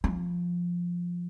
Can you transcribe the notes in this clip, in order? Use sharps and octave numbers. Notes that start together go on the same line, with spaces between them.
F3